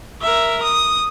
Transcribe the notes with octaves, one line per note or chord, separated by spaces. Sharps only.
A#4 E5
D#6